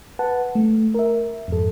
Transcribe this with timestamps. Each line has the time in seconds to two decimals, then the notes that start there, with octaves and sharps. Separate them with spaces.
0.19 B4 F#5 A5
0.55 A3
0.94 A#4 E5
1.48 F2 G#2 A4